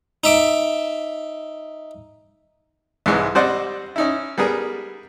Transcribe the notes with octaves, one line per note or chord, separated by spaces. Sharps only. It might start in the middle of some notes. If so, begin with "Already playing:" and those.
D#4 E5 D6
C2 G#2 E3 G#3
G3 C4 C5 D5 D#5 F#5
C#4 D#4 E4
G3 B3 G#4 A#4